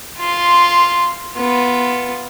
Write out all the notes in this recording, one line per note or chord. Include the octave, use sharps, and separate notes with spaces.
F4 C6
B3 F4